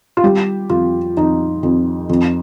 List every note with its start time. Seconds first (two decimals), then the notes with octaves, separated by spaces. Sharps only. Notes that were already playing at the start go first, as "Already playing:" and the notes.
0.17 F4
0.24 G3 G4
0.70 F2 F4
1.17 F2 D#4
1.63 F2
2.09 F2